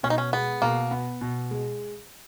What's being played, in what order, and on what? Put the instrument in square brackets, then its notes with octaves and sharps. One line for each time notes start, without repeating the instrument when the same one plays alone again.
[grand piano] B2 [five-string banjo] C#4
[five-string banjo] D#4
C#4
[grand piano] G#3 [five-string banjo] B3
[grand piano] B2 [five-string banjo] A#3
[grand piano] B3
B2
G#3